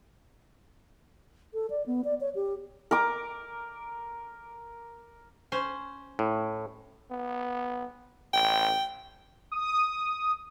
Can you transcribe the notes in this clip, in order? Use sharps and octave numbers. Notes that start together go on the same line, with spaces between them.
A4
D5
B3
D5
C#5
G4
A#4 D6
C#4 C5
A2
B3
A1 G5
D#6